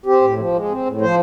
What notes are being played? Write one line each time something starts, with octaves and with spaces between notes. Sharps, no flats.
C4 G4
A2
F3
G#3
C4
A2
F3 C5